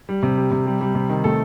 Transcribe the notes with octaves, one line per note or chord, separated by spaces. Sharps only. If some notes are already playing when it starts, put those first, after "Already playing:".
G3
C3
G3
C3
G3
G3
C3
D#3
C3 A3 A4